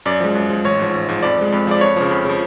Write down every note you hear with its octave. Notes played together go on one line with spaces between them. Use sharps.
F#2 D5
F3 G#3
F#2
F3 G#3
A1 C#5
G#2 F3
A1
G#2 F3
F2 D5
F3 G#3
F2
F3 G#3 D5
F2 C#5
C#3 F3
F2
C#3 F3